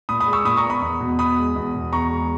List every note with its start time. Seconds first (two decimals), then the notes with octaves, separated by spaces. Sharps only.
0.09 A#2 B5 D#6
0.20 B5 D#6
0.27 G#3
0.33 C#6 E6
0.45 A#2 B5 D#6
0.57 A#5 C#6
0.64 B3
0.70 B5 D#6
0.82 E2
1.00 B2
1.19 E2 B5 D#6
1.38 G#3
1.56 E2
1.75 B2
1.93 E2 A#5 C#6
2.11 G#3